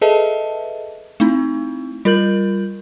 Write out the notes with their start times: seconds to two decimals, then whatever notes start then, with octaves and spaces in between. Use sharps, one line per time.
0.01 G#4 A4 B4 D#5 E5 A5
1.20 A3 C4 D#4 E4
2.05 G3 F4 A#4 G6 F#7